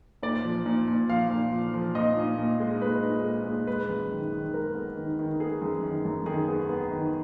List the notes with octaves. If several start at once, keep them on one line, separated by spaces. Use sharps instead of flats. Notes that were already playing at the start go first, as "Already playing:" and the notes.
A#2 D5
F3
A#2
A#2
F3 F5
A#2
F3
F3
A#2 D#5
A#2
A#2
G#3
A#2 B4
A#2
G#3
A#2
G#3 B4
F#2
D#3
D#3
G#3 A#4
B3
D#3
D#3
B3 G#4
F#2
D#3
F#2
D#3 G#4
B3
B3
D#3